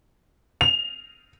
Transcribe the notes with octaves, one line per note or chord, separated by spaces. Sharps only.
F7